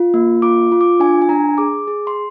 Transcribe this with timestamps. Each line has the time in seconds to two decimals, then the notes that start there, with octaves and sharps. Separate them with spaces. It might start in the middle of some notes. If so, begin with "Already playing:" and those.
Already playing: F4
0.14 A#3
0.42 F4 D6
0.72 F4
0.81 D6
1.00 D4 G#5
1.22 G#5
1.29 D4 A#5
1.58 G#4 D6
1.88 G#4
2.07 C6